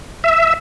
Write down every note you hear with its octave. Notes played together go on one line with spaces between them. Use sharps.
E5